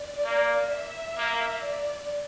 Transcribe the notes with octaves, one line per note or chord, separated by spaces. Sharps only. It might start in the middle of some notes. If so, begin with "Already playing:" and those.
Already playing: D5
A#3
E5
A#3
D5